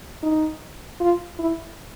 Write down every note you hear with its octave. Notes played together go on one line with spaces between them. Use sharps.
D#4
F4
E4